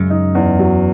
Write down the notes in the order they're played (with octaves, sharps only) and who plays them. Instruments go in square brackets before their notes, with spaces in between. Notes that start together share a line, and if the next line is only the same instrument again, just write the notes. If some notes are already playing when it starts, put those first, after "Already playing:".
Already playing: [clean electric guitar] F#2 [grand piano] C#3 G#3
[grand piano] D#4
E2
F#3